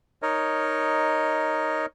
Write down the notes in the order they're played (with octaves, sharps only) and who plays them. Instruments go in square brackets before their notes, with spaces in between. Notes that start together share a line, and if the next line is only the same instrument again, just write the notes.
[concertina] D#4 A#4 C#5 D#5